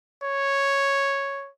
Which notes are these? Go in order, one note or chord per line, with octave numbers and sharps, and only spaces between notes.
C#5